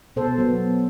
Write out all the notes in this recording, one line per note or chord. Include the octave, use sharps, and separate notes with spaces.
B2 A4 C5
F#3 B3